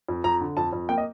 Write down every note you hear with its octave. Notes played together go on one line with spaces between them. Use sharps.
F2
F2 A#5
D3
F2 A5
F2
A#3 G5
D#5